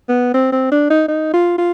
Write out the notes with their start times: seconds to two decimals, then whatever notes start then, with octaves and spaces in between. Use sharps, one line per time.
0.09 B3
0.34 C4
0.52 C4
0.72 D4
0.91 D#4
1.08 D#4
1.34 F4
1.58 F4